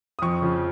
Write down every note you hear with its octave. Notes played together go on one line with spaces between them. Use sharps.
D#6
F2 C#6
C#3 F3